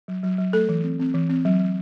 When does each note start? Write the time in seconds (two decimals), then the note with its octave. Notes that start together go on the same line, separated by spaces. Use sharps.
0.08 F#3
0.23 F#3
0.38 F#3
0.53 A3 A4
0.69 E3
0.83 C4
0.99 C4
1.14 E3
1.29 C4
1.45 F#3
1.60 F#3